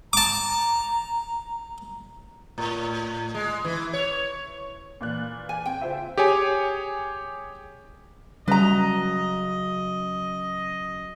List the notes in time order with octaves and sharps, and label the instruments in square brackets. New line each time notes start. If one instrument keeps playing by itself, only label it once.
[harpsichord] A5 D6 [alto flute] A#5
[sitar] A2
G#3
E3
C#5
[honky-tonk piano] A#2 D5 F#6 [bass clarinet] E3
[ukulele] G#5
[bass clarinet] C4 [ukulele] G5
[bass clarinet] C#3 [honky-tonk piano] F4 C5 E5
[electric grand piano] G4 G#4 C#5 G#5
[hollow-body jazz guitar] C#3 F#3 [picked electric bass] G3 [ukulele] B4 A#5 [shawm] D#5